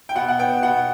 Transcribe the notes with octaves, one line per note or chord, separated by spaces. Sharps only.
G5
B2 F#5
F#5
B3 G5
B2 F#5